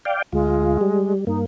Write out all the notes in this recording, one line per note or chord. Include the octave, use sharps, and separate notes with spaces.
D5 F5 G5
D2 G#3 F4
G3
G2 A#3 D#4